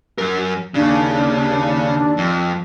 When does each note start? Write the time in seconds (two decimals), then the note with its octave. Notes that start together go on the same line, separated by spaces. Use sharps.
0.18 F#2 A#4
0.74 D#2 C#3 D4
2.17 F2